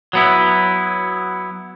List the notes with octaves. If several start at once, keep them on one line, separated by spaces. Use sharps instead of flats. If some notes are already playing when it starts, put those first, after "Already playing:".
F#3 B3 E4